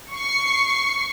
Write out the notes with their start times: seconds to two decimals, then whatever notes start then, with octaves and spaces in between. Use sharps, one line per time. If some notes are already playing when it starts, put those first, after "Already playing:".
0.13 C#6 C7